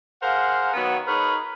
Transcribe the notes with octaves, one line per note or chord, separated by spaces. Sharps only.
G#4 A#4 C5 F5 F#5
D#3 F#3 B3
D#4 G#4 A#4 B4 C#5